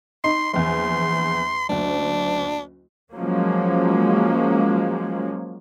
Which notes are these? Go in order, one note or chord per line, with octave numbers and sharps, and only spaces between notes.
D#4 C6
A#1 E2 C6
F#1 D2 D4
F3 F#3 G#3 A#3 C#4